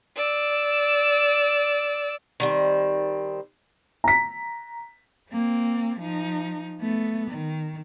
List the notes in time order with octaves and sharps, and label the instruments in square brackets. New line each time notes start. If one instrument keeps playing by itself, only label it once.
[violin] D5 E6
[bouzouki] D#3 G3 C4
[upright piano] A#5 B6
[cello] A#3 C4
F3 D#4
A3 B3
D#3